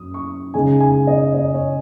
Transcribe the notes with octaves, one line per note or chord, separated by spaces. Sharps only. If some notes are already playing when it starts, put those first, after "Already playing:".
Already playing: F#2 D#6
C#6
C#3 G#3 D#4 G#5
G#5
D#5
D#5
C#5